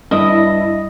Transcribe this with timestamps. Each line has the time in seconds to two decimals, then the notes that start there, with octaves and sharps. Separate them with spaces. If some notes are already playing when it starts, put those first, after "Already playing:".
0.11 G2 E4 D#5